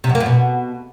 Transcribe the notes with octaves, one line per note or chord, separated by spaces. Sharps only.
C3
F#2
A#3
F#2
B2